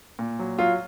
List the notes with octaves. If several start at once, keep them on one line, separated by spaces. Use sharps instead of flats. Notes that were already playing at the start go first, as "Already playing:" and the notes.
A#2
F#3
F#3 F4